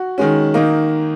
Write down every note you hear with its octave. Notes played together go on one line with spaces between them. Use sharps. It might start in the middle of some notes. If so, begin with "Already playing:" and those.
Already playing: F#4
D#3 G#3 C#4
D#3 A#3 D#4